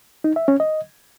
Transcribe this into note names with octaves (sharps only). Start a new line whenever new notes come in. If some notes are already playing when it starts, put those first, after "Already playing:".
D#4
E5
C#4
D#5